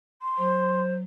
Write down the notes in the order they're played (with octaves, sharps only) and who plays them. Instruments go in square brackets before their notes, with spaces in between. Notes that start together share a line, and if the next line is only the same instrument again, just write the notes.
[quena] C6
[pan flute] F#3 [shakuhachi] C5